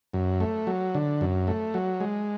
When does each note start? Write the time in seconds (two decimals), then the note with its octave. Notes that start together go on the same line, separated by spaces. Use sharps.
0.14 F#2
0.40 A3
0.67 F#3
0.95 D3
1.21 F#2
1.47 A3
1.74 F#3
2.00 G#3